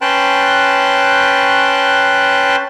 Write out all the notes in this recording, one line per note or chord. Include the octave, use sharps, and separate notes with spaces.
C#4 B4 G5 A5 C6 F#6